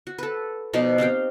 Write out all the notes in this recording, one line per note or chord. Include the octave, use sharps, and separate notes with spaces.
F#4
A4 B4
B2 F3 D#4 D5
C4 G4 F5 G5